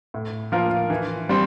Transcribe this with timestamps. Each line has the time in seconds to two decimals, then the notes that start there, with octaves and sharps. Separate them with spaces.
0.14 A2
0.52 F3 A#3 F4 A#4
0.90 E3
1.29 G3 C4